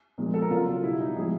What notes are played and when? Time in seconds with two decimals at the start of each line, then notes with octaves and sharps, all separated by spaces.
0.18 A#2 F3 G#3
0.34 A4
0.42 A#4
0.50 C#3 F#3 F4
0.83 B2 G3 E4
1.00 D#4
1.16 A2 F3 G#3 G#4